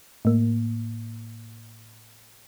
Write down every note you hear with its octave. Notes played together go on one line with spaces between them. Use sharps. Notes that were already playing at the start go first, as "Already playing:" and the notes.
A2 A#3